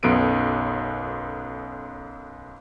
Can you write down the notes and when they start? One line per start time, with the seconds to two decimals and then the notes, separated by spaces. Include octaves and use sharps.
0.03 B1 F#2 B3 A4 D7 D#7